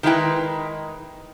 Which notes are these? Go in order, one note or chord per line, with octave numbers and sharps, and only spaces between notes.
D#3 G#3 D#4 E4 B4 G5